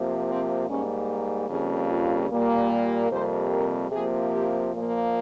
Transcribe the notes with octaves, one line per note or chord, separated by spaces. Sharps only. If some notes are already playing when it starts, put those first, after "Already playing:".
Already playing: C3 F3 A#3
C4
G#2 G3 A#3 C#4
F2 C#3 G3 A#3 G#4
F4
A#2 G3 A#3
G4
F2 C3 G3 A#3 C5
A#4
C3 F3 A#3 G#4
G4
A#2 F3 A#3